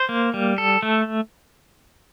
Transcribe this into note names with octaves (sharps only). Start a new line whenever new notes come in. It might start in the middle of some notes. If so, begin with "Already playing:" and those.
Already playing: C5
A#3
G3
A4
A3